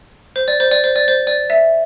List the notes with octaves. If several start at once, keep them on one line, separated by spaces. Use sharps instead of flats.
C5
D5
C5
D5
C5
D5
C5
D5
E5